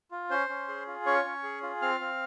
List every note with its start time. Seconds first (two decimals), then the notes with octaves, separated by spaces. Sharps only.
0.11 F4
0.30 C#4 C5 C6
0.49 C#4
0.68 G#4
0.87 F4
1.06 C#4 C#5 C#6
1.25 C#4
1.43 G#4
1.63 F4
1.82 C4 F5 F6
2.01 C4